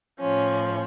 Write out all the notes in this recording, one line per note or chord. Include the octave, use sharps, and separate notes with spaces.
A2 F3 C#4